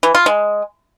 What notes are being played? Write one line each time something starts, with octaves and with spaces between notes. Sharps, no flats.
E3
F4
G#3